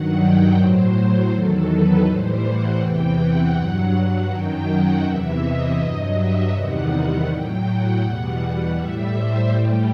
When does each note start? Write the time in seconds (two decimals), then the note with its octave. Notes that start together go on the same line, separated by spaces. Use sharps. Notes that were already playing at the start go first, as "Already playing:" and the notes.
Already playing: G2 D#3 F#3 F#5
0.19 G5
0.56 A2 F#3 C5
1.30 E2 D#3 F#3 A4
1.67 B4
2.04 A2 E3 G3 C5
2.42 F#5
2.79 E2 C3 E3 G5
3.16 F#5
3.54 G2 F#3
4.28 F#2 D#3 F#3 G5
4.66 F#5
5.02 E2 C3 E3 E5
5.40 D#5
5.77 G2 F#3
6.14 E5
6.52 E2 C3 D#3 G3 F#5
7.26 A2 F#3 G5
7.63 F#5
8.00 E2 B2 G3 F#5
8.75 A2 G3 E5
9.12 C5
9.50 A2 G3 G4